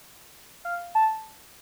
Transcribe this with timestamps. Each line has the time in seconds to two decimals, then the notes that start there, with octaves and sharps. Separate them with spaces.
0.65 F5
0.95 A5